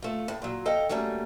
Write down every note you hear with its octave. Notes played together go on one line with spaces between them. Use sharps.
A3 F4
A2
A#2 F#3
A4 D#5 F5 G5
F#3 G3 A3 A#3 C#4